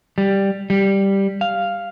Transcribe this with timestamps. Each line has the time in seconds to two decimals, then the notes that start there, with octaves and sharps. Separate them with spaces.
0.18 G3
0.70 G3
1.41 F5